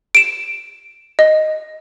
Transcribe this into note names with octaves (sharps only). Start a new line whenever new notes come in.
D7 E7
D#5